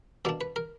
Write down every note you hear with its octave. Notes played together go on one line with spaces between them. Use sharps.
B2 A#3 D4 D5
B4
A#4